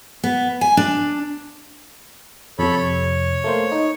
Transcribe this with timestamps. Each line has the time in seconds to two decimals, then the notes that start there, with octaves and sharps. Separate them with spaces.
0.23 B3
0.61 G#5
0.77 D4
2.59 F2 C3 A4 C#5 B5
2.77 C#5
3.44 A3 A#3 C5
3.72 D#4